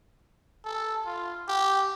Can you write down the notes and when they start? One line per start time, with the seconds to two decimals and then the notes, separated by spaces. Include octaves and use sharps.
0.65 A4
1.06 F4
1.49 G4